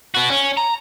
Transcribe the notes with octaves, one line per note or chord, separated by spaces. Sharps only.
B3 F#4
C#4
A#5